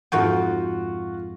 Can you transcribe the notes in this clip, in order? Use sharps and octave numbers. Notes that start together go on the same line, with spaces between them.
F2 G#2 F4 F#4 F#5 G5 C#6